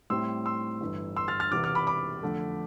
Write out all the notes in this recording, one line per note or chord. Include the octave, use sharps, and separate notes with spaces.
A2 G3 C4 E4 C6 E6
C6 E6
G1 G2 E3
C6 E6
F6 A6
F6 A6
E1 E2 C3 E3 D6 F6
D6 F6
B5 D6
B5 D6
F2 D3 A3